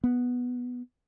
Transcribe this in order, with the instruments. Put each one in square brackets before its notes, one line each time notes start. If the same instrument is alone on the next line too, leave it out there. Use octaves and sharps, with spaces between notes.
[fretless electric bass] B3